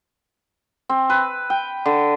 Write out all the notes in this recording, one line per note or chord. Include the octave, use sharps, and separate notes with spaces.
C4
B4
G5
D3